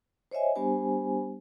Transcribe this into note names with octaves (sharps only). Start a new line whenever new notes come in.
C5 C#5 D#5 E5 G#5
G3 B3 D4 G4 C5 G#5